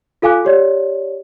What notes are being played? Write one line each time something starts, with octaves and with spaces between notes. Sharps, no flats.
F4 A4 F5 G#5 D6 F#6
G4 C#5 D5